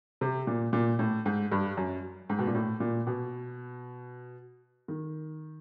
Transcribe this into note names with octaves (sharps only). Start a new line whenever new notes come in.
C3
A#2
A#2
A2
G#2
G2
F#2
G#2
B2
A#2
A2
A#2
B2
D#3